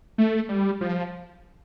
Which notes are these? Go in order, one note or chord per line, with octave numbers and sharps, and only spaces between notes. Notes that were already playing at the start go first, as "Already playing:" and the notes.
A3
G3
F3